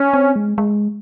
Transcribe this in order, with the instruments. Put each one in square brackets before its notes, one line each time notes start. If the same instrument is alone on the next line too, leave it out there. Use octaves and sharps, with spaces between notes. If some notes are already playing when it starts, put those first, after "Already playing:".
Already playing: [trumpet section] C#4
[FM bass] C4
G#3
G#3